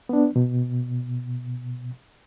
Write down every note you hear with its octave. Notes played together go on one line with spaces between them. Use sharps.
B3 D4
B2